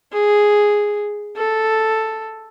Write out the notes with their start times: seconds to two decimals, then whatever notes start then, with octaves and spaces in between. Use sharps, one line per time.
0.13 G#4
1.37 A4